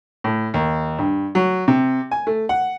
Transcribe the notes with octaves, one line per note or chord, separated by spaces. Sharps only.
A2
D#2
G2
F#3
C3
G#5
A3
F#5